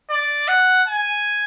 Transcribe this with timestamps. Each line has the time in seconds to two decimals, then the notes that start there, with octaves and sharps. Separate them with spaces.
0.10 D5
0.48 F#5
0.88 G#5